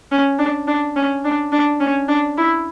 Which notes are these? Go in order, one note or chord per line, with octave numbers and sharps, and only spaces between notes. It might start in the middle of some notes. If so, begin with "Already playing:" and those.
C#4
D4
D4
C#4
D4
D4
C#4
D4
E4